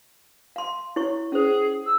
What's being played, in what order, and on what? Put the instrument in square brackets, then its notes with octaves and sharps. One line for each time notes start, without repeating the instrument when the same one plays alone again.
[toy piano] F5 C6
E4 C#5 C#6
[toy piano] C#4 C5 [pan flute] G#4
[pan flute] E6